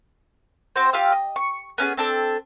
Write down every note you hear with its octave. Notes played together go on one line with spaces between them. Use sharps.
C4 F#4 C5
F4 G4 F5 E6
D#5
C#6
B3 C#4 F#4 G#4
C4 D4 A4